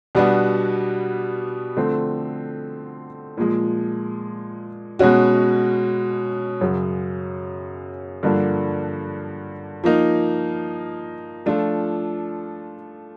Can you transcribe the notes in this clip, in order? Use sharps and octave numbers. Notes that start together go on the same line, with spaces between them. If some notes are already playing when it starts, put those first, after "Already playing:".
B2 G3 B3 D4 F#4
D3 F3 A3 C4
A#2 F3 G#3
B2 G#3 C#4 F#4
F#2 C#3 F#3
G2 D3 F3 A#3 D4
F3 A#3 D#4
F3 A3 D4 F4 A4